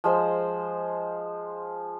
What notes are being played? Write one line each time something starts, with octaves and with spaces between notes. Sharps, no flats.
F3 G#3 C5